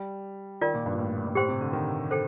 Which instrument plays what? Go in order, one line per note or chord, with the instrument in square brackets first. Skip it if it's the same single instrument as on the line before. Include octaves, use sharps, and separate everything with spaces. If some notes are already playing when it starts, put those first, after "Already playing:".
Already playing: [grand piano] G3
[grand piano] D#3 [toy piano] F4 A#4 D5
[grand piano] A#2
G2
A#2
A2
A2
G2
[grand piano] A2 [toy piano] G4 C5 G5 C6
[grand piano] C3
D3
D#3
[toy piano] A4 C5 G5